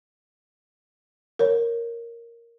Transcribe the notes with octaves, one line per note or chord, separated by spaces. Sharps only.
A#4 C#5